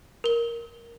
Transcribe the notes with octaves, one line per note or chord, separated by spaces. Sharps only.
A#4 G7